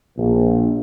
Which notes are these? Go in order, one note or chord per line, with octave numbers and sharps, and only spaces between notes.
A#1